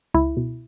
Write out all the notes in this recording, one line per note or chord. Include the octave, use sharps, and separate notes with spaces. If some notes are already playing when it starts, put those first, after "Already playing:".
C#2 E4
B2